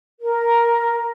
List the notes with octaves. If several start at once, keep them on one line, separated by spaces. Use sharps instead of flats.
A#4